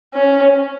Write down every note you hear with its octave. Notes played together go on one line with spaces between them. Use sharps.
C#4